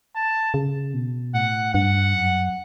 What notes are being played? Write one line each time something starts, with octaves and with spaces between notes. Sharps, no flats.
A5
C#3
B2
A2 F#5
G2 F#5
F#2